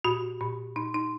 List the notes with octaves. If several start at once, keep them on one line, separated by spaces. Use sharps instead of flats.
A#2 F#4
A#2
A#2 D#4
D#4